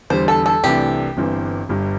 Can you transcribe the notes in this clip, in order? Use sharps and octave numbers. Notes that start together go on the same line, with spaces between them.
E2 D3 G3 C5
A4
A4
C2 C3 E3 A3 D4 G4
G1 G2 E3 C4
G1 G2 G3